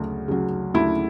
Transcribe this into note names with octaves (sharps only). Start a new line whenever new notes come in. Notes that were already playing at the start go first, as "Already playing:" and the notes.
Already playing: D2 C#3 F#3
C#3 F#3
D2 E4